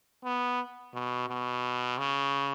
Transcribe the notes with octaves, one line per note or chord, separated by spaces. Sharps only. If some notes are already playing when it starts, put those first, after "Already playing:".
B3
B2
B2
C#3